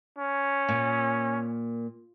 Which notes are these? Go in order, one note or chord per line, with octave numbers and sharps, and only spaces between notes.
C#4
A#2